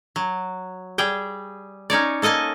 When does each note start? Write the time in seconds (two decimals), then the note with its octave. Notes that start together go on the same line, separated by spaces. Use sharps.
0.16 F#3
0.98 G3 G#4 G5
1.90 C#4 D#4 C#5 D5
2.22 A#3 A4 D#5 G#5 A5